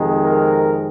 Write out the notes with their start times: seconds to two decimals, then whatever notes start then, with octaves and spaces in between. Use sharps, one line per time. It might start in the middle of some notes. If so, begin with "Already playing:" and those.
Already playing: F2 C3 D#3 G#3
0.24 A#4